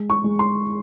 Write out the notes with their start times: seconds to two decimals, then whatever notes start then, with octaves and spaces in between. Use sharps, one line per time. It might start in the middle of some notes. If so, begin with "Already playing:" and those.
Already playing: G#3
0.10 C#6
0.24 G#3
0.39 C6